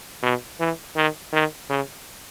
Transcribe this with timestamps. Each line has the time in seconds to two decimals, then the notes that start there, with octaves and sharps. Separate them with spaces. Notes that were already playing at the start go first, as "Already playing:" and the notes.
0.23 B2
0.60 E3
0.96 D#3
1.33 D#3
1.70 C#3